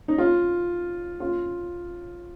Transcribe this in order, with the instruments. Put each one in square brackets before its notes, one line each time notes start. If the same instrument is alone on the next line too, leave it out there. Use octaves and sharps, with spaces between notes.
[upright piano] D#4
F4
F4